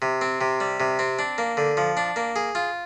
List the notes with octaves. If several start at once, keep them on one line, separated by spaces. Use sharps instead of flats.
C3
C4
C3
G3
C3
C4
D4
A#3
D3
F3
D4
A#3
G#4
F4